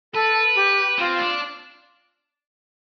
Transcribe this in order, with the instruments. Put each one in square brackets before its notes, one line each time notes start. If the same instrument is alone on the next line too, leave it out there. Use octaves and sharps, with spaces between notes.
[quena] A4 [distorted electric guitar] B4
[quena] G4
[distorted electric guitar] C4 [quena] F4
[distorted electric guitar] D4